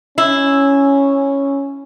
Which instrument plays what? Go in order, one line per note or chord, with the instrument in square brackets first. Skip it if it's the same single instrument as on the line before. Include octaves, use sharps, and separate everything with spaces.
[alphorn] C#4 [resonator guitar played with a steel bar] E4